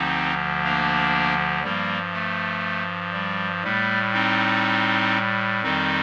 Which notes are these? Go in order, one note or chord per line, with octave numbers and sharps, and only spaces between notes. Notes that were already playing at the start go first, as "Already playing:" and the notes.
Already playing: D2 D3 F3 C4 D#4
A#3 D4
G2 F3 G3 A#3
A3
G3
A2 G3 A3
C4 D#4
F2 D#3 G3 C4 D#4